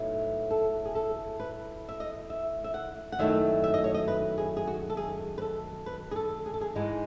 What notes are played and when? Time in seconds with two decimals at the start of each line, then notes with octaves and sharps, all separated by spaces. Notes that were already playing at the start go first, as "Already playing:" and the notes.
Already playing: A2 F#3 B3 D#4
0.51 A4
0.85 G#4
0.95 A4
1.40 B4
1.89 E5
2.00 D#5
2.30 E5
2.64 E5
2.74 F#5
3.12 F#5
3.19 F#2 D#3 F#3 A3 E4 E5
3.64 E5
3.74 D#5
3.84 C#5
3.94 D#5
4.08 B4
4.38 G#4
4.57 G#4
4.67 F#4
4.90 A4
4.97 G#4
5.38 B4
5.42 A4
5.86 B4
6.11 G#4
6.16 A4
6.46 G#4
6.54 A4
6.61 G#4
6.75 G#2 E3 G#3 D#4